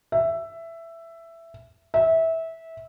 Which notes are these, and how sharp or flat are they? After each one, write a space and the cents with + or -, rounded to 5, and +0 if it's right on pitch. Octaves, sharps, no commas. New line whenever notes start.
E5 +10
E5 -20